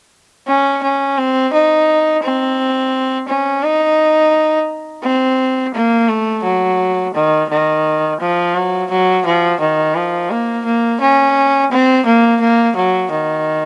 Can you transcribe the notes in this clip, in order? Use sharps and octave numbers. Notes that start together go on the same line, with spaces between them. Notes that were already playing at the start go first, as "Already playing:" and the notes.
C#4
C#4
C4
D#4
C4
C#4
D#4
C4
A#3
A3
F#3
D#3
D#3
F3
F#3
F#3
F3
D#3
F3
A#3
A#3
C#4
C4
A#3
A#3
F#3
D#3